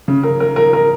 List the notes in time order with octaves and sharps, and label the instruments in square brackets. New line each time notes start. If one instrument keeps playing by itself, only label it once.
[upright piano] C#3
A#4
A#4
A#4
A#4